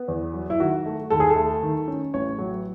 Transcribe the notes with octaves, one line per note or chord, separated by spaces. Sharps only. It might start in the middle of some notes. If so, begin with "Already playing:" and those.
Already playing: B3
E2
F#3
E4
D#3 F#4
A3
D#2 A4
G#4
A4
A3
D#3
C#4
A1 C#5
F#3